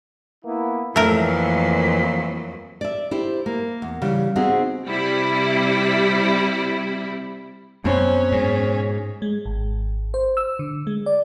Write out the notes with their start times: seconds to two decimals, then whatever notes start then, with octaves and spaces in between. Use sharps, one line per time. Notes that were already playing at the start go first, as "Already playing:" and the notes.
0.44 A#3 B3 E4
0.96 F2 E3 F#3 A3 A#3 A#4
2.81 D5 E5
3.11 E4 G4 C5
3.46 A#3
3.82 E2
4.02 C#3 E3 G3
4.36 B3 C4 D#4 F#4 G#4
4.87 C3 G3 E4
7.85 F#2 B2 C4 C#4
8.32 G#2
9.22 G#3
9.46 G#1
10.14 C5
10.37 E6
10.59 D3
10.87 G#3
11.06 D5